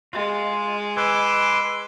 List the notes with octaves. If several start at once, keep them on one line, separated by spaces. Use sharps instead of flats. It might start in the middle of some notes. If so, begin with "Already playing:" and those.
G#3 F4
B4 G#5 C6 D6 E6